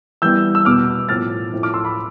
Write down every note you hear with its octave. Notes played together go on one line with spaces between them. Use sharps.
E3 G3 B3 E4 E6 G6
E6
E2 B2 B3 D6 F6
A2 F3 C4 F6 A6
A2 F3 C4 E4
D6 F6
C6 E6
B5 D6